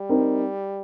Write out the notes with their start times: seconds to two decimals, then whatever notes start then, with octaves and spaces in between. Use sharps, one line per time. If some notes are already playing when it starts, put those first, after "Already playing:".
Already playing: G3
0.09 C4 D#4 A#4